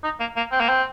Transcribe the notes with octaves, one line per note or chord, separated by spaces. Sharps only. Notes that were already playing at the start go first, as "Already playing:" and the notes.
D#4
A#3
A#3
C4
A#3
C4